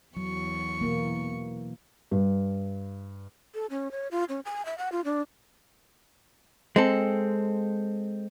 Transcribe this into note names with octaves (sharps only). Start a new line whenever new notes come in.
E2 F#3 C#6
B2 E3 A#3
G2
A4
C#4
C#5
F4
C#4
G#5
E5
F#5
F4
D4
G#3 C4 A4